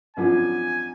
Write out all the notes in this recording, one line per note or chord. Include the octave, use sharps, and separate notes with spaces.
G#1 F#2 D3 F3 G#5